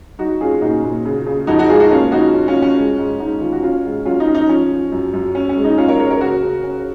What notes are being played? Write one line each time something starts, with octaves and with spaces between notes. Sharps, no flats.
F#3 D#4 F#4
C#4 F4 G#4
A#2 D#4 F#4
A#2
C#3
C#3
F2 D#4 F#4
D#4 F#4
G#3 F4 G#4
D#4 F#4
A#3 C#4 F4
F3 D#4 F#4
C#4
C#4 F4
F3
C#4
G#3
G#2
G#2 D#4
D#3 F4
F#4
C#4 F4
G#2
F#3 C#4 F4
D#4
C#4
D#4
F3 C#4
F3
F#2
F#2
C#4
C#4
G#3
D#4
C#4 F4
A#4 C#5
C#4 A#4 C#5
A#4 C#5
C#3 F#4 A#4
C#3
C#4